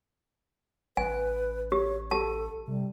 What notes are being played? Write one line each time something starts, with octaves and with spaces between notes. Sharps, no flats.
A1 B4 G#5
G4 C#5
G4 A4 A5
C3 G3